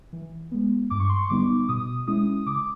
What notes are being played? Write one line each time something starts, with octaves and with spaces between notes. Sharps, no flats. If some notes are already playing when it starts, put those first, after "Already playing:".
E3
G#3 B3
G2 D6
C#6
C6
C#6
D3 G3 B3 D#4 D6
B2 D#6
G#3 C#4 E4 D#6
C#3 D6